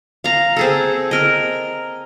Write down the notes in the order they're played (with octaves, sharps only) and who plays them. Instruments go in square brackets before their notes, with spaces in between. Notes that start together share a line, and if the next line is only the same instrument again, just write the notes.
[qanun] F5 A#5
C4 G#4 A4
A#4 D#5